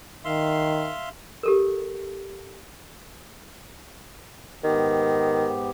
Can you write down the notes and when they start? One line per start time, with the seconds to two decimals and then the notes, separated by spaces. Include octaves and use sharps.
0.25 D#3 E5 F5 C6
1.43 G4 A4 A#4
4.64 G#2 D#3 B3 G4